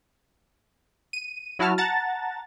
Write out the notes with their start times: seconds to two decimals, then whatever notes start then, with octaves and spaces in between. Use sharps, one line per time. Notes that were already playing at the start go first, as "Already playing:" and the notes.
1.13 D#7
1.59 F#3 E4 F#4 A5 F6
1.78 F#5 A5 A#5 A6